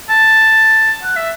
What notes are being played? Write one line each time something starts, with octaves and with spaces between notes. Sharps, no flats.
A5
F#5
E5